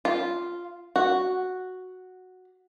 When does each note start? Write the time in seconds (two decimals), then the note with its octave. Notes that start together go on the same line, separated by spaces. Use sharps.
0.05 F4
0.96 F#4